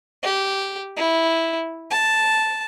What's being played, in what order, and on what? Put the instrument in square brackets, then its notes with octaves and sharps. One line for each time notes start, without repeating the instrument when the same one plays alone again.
[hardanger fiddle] G4
E4
A5